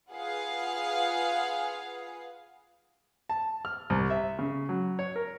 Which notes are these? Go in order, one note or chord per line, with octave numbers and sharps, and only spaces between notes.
F4 G#4 B4 F5 F#5
A5
F6
C2
E5
C#3
F#3
C#5
A#4